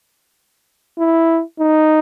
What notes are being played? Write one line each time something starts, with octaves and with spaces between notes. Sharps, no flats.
E4
D#4